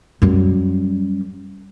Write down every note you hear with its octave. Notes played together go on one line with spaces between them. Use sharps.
F#2 G3